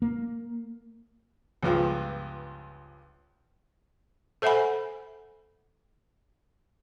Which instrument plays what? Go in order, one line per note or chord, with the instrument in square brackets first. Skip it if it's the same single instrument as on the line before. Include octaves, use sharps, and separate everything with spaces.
[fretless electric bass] A#3
[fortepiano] C#2 G2 F3 B3
[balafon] A4 C5 E5 F#5 G#5 B5